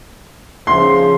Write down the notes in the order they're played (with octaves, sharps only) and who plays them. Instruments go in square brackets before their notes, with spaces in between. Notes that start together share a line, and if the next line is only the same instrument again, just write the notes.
[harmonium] C#3 F3 [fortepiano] C6